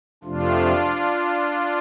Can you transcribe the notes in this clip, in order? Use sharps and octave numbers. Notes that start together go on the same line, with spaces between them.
F2 C3 F3 A3 D4 F4